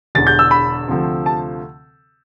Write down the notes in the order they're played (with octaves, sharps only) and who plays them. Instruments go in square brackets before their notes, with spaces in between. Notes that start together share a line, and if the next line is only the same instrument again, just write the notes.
[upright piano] E1 E2 D3 A6
G6
E6
B5
D2 C3 F3 A3 C4
A5